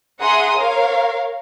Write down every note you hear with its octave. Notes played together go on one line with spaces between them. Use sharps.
G#4 E5 F#5 A#5 C6 D#6
A#4 C#5 F5